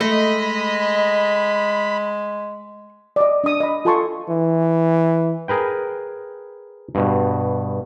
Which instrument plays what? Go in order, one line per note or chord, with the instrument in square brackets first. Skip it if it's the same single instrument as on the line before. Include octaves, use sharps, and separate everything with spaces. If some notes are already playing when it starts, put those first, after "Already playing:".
[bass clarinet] G#3 [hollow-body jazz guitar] A3 [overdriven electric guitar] D#5 [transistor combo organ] B5
[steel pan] D5 D#5
D4 D#6
D#5 B5
F4 A4 G#5 A5 C6 C#6
[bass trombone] E3
[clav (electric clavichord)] G#4 A#4 B4 G5
G2 B2